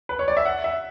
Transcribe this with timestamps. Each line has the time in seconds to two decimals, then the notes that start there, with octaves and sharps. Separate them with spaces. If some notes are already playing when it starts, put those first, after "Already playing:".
0.09 B4
0.19 C#5
0.28 D5
0.37 E5
0.45 F#5
0.64 E5